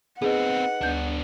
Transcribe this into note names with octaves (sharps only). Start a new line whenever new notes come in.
B3 C4 D#4 G#4 B4 D#5 F#5
D2 B3 D4 G6